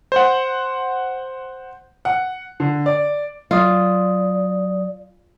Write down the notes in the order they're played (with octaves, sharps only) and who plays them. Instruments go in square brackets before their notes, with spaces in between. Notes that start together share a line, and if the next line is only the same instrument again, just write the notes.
[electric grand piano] C5 F#5
[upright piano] F#5
D3
D5
[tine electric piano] F#3 D#6 [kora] F4 [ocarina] D5